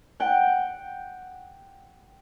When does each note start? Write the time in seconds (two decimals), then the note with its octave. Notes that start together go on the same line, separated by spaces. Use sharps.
0.20 F#5 G5